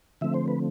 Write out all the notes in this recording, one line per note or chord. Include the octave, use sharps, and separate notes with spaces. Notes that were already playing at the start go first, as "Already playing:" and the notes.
D3 F3 A3 C4 E5
C5
B4